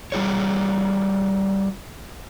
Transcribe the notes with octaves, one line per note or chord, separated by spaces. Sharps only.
G3 F4 G#4 C#5